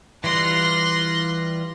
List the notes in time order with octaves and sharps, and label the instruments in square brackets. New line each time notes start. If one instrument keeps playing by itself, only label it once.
[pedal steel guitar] E3 G3 F4 [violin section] C6 F#6 A#6